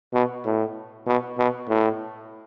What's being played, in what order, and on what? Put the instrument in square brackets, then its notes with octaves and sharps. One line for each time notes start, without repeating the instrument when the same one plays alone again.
[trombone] B2
A2
B2
B2
A2